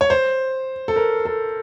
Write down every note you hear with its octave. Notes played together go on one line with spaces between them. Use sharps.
C#5
C5
A4
A#4
A4